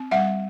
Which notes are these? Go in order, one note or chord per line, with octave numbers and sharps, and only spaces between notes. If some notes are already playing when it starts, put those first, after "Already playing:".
Already playing: C4
G3 E5 F#5